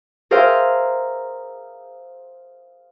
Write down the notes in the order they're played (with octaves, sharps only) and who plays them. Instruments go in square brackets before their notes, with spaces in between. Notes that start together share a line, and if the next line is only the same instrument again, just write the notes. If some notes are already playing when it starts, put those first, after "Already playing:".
[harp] G#4 A#4 C5 E5 F5 G5